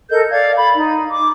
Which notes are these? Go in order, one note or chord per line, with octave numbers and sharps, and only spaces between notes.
A4 A#4 D#5 G6
D5 F5 G#6
B5
D#4
D6